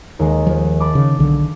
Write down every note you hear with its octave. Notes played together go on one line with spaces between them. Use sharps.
D#2 G#3
F3
A5 B5 D6
C#3
B1 D3